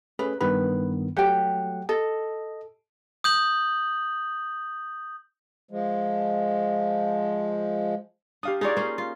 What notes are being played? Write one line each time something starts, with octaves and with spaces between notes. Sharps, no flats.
A3 C#4 G#4 B4
G2 D#3 B3 B4
F#3 A3 G4 F#5 G5
A4 D#5
D#6 G6 F#7
F3 G#3
D4 G4 F5 D#6
D#4 F4 G#4 C#5 D5
A#3 C#4 C5
F4